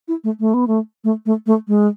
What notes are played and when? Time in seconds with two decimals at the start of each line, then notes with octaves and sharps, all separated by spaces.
0.08 E4
0.24 A3
0.40 A3
0.54 B3
0.67 A3
1.04 A3
1.26 A3
1.46 A3
1.68 G#3